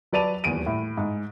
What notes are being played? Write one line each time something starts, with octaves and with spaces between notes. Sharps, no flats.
F#3 B4 D5 A5 D#7 F7
D#1 E2 D7 D#7
A2
G#2